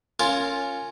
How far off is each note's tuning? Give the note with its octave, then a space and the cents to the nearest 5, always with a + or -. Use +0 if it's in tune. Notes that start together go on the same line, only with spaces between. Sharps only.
C#4 +0 F4 +0 A#4 -25